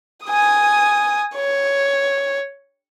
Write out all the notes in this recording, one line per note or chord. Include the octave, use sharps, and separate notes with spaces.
G#5 D#6
C#5